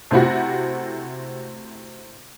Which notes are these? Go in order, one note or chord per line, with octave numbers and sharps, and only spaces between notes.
C3 A3 C4 E4 F#4